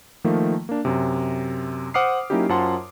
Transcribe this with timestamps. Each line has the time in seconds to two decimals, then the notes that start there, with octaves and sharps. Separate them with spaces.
0.24 D#3 F3 A3 A#3
0.69 A#3 D4
0.85 F#2 C3
1.94 C5 F#5 D6 D#6 F6 C7
2.30 F#3 A#3 C#4 D#4 E4 G4
2.49 F#2 F4 C5 F#5 A5 C6